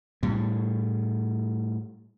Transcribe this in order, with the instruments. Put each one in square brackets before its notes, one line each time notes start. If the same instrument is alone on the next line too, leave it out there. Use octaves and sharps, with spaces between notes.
[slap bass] A2 G3